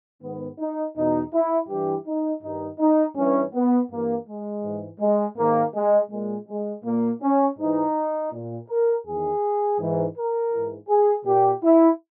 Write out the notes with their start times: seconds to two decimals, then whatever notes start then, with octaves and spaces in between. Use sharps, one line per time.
0.22 G#2 D#3 B3
0.59 D#4
0.96 E2 B2 D#4
1.33 E4
1.69 G2 E3 G4
2.07 D#4
2.42 G2 D#3 D#4
2.79 D#4
3.16 G2 E3 C#4
3.54 B3
3.90 G2 E3 A#3
4.27 G#3
4.63 G#2 E3
5.00 G#3
5.37 G#2 D#3 A#3
5.74 G#3
6.10 A#2 G#3
6.48 G#3
6.85 A#2 A#3
7.22 C#4
7.58 G#2 E3 D#4
8.32 A#2
8.68 A#4
9.06 E2 D#3 G#4
9.79 G#2 E3
10.16 A#4
10.52 G#2 E3
10.89 G#4
11.26 A#2 G4
11.64 E4